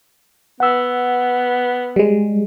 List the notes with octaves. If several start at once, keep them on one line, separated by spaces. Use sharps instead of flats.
B3 F#5 E6
G3 G#3